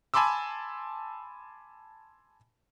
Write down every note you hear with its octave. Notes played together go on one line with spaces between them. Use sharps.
G#5 A5 B5 C6 D6 E6